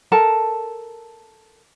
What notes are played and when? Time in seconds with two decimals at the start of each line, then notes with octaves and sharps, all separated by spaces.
0.12 A4 A#4 A5